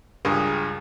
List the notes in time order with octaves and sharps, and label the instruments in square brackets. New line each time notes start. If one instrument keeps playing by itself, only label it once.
[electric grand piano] C#2 G2 G#4 A#4